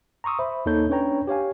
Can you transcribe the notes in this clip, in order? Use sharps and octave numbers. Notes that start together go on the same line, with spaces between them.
A#5 C6 C#6 D#6 E6
C5 E5 B5
D#2 A#3 D#4 A4 C#5 G6
C#4 D4 B4 C#5 G5 A#5
G4 C#5 F5 G#5